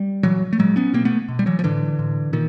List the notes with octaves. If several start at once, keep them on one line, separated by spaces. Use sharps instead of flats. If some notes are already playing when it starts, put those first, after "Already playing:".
Already playing: G3
A#2 E3 F#3
A3
A#2 F#3 G#3
B3 C#4
B2 A#3 C4
A3 B3
B2
G3
E3 F#3
F3
A2 D3 E3
A2
A#2 D#3